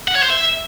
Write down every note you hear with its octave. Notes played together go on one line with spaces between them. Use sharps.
F#5
C#5
C5
E5